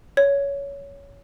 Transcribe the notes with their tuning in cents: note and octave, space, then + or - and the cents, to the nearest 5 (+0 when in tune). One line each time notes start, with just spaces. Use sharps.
C#5 +15